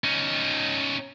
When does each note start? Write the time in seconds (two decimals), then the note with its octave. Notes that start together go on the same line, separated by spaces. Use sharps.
0.04 C#4 D#4